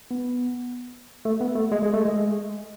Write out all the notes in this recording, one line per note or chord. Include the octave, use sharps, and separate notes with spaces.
B3
A3
B3
A3
G#3
G#3
A3
G#3